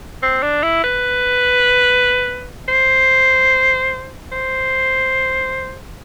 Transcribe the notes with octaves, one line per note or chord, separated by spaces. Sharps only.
C4
D4
E4
B4
C5
C5